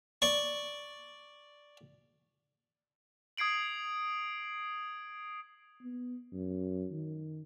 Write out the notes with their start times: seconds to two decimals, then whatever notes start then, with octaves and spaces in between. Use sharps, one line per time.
0.22 D5 C#6
3.37 D#6 G#6 C7 D7 F#7
5.82 B3
6.33 F#2
6.92 D#3